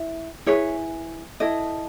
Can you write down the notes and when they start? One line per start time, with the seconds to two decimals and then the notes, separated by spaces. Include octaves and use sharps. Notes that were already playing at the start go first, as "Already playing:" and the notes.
Already playing: E4
0.46 E4 G#4 B4 C#5
1.40 E4 A4 D#5